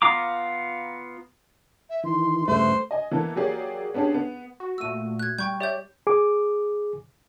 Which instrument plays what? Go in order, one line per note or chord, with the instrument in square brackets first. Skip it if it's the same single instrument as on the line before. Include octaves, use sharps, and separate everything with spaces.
[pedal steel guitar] B3 F4 F5 A#5 D6
[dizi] E5
[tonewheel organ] D#3 E3 [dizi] C6
[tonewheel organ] G2 C#3 G3 [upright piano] A3 [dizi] B4 [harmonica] C5
[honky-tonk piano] D#5 G#5
E3 A#3 B3 A4
F#3 A#3 G4 G#4 C#5 D5
B3 C#4 D4 G4 G#4
B3
[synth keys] F#4
[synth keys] A#2 A3 F#4 [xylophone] E6 D#7
[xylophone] F#6 G#6
[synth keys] G3 [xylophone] G5 C#6 G6
[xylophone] G4 C#5 G6 [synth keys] D5 E5
[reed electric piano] G#4 D6